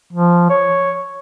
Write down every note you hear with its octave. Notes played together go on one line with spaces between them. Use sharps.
F3
C#5